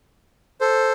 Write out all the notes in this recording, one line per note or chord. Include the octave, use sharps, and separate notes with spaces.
A4 C5